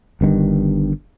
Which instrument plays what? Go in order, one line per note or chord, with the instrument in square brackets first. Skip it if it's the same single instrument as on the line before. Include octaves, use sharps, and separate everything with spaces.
[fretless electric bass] G1 G2 D3 D#3